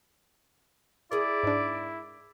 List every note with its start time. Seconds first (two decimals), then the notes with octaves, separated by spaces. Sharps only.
1.12 E4 G#4 A#4 D5
1.43 G#2 D4